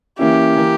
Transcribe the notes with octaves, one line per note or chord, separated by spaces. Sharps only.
E3 A#3 C#4 E4 G4
E3 A#3